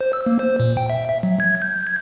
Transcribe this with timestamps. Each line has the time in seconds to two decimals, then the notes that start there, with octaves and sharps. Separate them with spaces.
0.01 C5
0.13 E6
0.26 A#3
0.39 C5
0.60 A#2
0.77 G5
0.90 E5
1.09 E5
1.23 F#3
1.40 G#6
1.62 G6
1.87 G#6